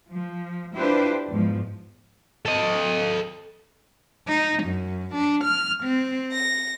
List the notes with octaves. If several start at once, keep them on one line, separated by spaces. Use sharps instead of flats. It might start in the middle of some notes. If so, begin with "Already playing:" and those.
F3
D4 E4 F4 G4 B4 C5
E2 G#2 F3
A4 D#5
D#4
F#2
D4
F6
C4
A#6